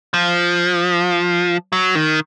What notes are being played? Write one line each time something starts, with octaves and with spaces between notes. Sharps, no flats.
F3
F#3
D#3